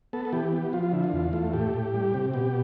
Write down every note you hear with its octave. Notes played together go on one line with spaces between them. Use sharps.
B3 A4
A4
E3 G4
B3
F3 F4
F4
D3 E4
F4
E2
A3
A2 G4
A2
G3
C3
B2 G4